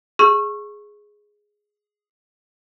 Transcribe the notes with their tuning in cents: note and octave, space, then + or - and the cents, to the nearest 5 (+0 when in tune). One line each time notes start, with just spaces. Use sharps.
G#4 +0 C#6 -20 E6 +40